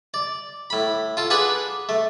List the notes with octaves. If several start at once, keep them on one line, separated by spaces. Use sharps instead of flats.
D5
A2 B5
F4 A4
D4 G#4 B4 D5 F#5 B5
A3